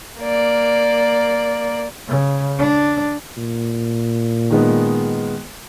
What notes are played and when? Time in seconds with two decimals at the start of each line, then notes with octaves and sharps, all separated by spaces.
0.20 A#3 D5
2.08 C#3
2.59 D4
3.37 A#2
4.50 D#3 G#3 B3